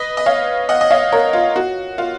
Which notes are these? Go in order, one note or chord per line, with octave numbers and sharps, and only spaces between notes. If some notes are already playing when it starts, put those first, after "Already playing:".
Already playing: B4 D#5
D#5
C#5 F5
D#5 F#5
D#5
C#5 F5
A#4 C#5
F4
F#4
F4